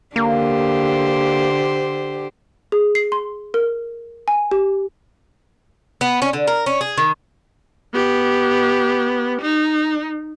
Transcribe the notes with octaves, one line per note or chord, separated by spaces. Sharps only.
D3 A#3 G4 C5
G#4
C7
C6
A#4
G#5
G4
B3
C#4
D3
A#4
C#4
G#4
D#3
B3 G4
D#4